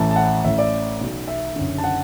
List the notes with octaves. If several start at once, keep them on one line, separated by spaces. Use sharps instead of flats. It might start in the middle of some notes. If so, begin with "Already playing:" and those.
Already playing: A1 A2 E3 A5
A5
F#5
A1 A2 E3 E5
D5
B1 B2
E5
F#1 F#2 D3
A5
F#5